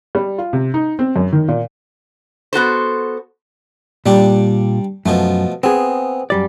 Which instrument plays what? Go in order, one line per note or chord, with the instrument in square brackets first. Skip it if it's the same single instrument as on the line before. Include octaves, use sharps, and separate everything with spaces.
[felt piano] G3
F4
C3
D#4
C4
F#2
D#3
A#2
[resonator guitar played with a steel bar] B3 F#4 A4 C5
[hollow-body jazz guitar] A#2 [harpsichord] G3 D4 G4
[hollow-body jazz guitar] F#2 [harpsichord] B2 F3 A3
[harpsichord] B3 [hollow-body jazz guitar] C4 G#4
[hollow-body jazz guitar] F#2 G3 D5